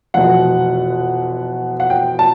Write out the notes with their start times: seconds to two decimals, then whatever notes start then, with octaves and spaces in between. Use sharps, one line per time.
0.14 F1 E2 B2 F#5
1.80 F#5
1.90 G5
2.19 A5